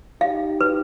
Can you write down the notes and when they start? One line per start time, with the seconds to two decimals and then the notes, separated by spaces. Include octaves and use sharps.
0.21 D#4 G4 F5
0.61 B4